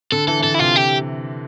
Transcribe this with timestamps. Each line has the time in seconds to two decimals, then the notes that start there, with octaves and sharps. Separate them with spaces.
0.12 D3 A4
0.27 E3 A4
0.40 E3
0.43 D3 A4
0.54 E4
0.59 C3 F4
0.76 G4